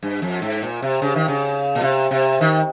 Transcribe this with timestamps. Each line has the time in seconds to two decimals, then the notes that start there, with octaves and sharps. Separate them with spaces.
0.03 G2
0.22 F2
0.42 G#2
0.62 A#2
0.82 C3
1.02 C#3
1.16 D#3
1.28 C#3
1.75 A#2
1.82 C3
2.11 C3
2.41 D#3